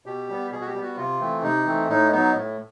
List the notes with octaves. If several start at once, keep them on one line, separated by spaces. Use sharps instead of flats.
B2 G4
G3 B3
B2 G#4
F#4
G4
G3 B3
F#4
C3 F4
E3 A3 C4
C3 D#4
E3 A3 C4
A2 D#4
F#3 B3 D#4
A2